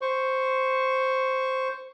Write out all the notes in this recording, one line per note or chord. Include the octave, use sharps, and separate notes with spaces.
C5 C#6